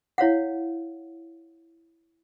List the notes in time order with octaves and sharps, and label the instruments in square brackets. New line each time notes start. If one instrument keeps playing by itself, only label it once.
[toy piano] E4 C#5 F5 F#5